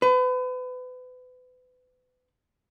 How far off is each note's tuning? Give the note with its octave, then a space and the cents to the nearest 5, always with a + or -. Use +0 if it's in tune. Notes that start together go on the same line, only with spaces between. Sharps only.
B4 +35